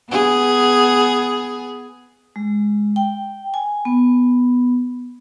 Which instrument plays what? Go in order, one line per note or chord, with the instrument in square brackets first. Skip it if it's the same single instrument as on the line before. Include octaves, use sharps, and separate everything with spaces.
[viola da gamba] B3 G#4
[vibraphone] G#3
G5
G#5
B3